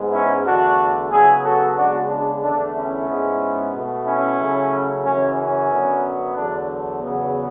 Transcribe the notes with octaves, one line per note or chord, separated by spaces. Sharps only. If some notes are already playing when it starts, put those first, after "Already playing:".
Already playing: G#2 G#3 B3
C#4 E4
E2 D3 A3 D4 F#4
C#3 F#3 B3 E4 G#4
F#4 A4
C#3 G#3 B3 D4 F#4
D4
E2 D3 A3 D4
C#4 E4
G#2 G#3 B3
B2 A3
C#4 E4
C#3 F#3 A3
F#2 C#3 E3 C#4
C#4
F#2 D3 F#3 B3
E2 D3 F#3 A3 D4
E2 C#3 F#3 B3